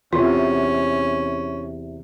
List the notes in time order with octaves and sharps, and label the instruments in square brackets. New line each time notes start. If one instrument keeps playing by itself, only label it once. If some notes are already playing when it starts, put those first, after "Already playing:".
[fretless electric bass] E2 C3 [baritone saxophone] C#4 [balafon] F4